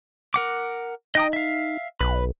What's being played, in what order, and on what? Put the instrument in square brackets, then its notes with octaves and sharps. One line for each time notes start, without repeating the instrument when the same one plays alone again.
[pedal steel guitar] A#4 F#5 D6
[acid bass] D#4 [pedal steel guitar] D#5 G5 D#6
[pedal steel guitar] E5 F5
[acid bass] B1 [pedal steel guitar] B4